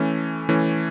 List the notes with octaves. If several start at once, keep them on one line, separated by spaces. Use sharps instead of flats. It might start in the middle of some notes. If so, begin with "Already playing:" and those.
Already playing: E3 A3 C#4
E3 A3 C#4